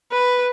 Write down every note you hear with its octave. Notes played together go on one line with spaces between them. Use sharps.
B4